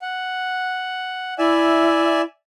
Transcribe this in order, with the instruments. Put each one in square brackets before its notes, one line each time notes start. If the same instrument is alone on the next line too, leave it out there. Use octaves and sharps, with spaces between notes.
[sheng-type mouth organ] F#5
[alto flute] E4 [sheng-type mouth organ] D5 E5 G#5